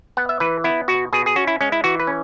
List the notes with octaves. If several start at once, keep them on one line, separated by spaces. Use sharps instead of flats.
B3 F#5
E5
E3 B4
B3 E4
B2 F#4
B2 G#4
G#4
C#4 F#4
E4
G#3 C#4
E4
E3 F#4
B4
C#4